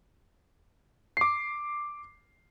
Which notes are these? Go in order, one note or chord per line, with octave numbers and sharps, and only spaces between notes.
D6 C7